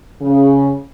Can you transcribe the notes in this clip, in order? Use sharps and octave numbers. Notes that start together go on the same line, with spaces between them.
C#3